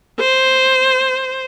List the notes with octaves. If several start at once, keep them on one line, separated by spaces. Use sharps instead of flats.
C5